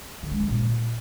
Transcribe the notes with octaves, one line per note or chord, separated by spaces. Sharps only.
D3
G#3
E3
A#2